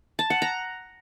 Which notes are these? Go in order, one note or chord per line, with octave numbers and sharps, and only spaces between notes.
A5
F#5
A#5